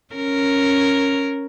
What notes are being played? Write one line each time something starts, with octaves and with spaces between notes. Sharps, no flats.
C#4 A#4